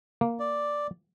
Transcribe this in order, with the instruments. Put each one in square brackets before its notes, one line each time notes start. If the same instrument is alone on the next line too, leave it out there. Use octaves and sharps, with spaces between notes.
[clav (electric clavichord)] A#3
[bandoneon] D5